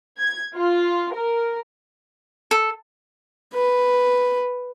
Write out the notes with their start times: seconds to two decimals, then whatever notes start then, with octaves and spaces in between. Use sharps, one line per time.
0.19 G#6
0.56 F4
1.15 A#4
2.51 A4
3.54 B4